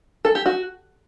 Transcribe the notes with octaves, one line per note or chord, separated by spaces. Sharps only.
A4
G4
F#4